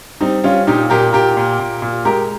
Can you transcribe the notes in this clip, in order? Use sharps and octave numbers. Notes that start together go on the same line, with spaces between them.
G3 C4 D#4
G3 C#4 F4
A#2 D#4 G4
A#2 G4 A#4
A#2 G4 A#4
A#2
A#2
A#2
G#3 G4 A#4